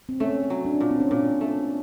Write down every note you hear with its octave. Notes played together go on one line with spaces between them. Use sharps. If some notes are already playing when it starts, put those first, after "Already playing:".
C4
A3 C#4
F#3
D4
A#2
C4
C#4
A#2 D4
A3